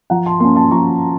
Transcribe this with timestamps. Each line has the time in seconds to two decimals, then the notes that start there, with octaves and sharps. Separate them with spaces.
0.10 F3 F#5 A#5
0.26 A5 C6
0.40 A#3 A5 C6
0.44 C#4
0.56 A5 C6
0.71 F3 A#5 C#6